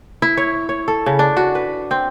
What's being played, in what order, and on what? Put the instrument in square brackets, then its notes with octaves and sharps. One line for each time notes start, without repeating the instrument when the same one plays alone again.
[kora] E4
C#5
C#5
A4
C#3
D4
F#4
B4
C4